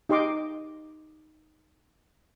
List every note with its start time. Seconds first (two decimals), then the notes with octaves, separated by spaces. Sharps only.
0.09 D#4 G4 D#5 C6 D6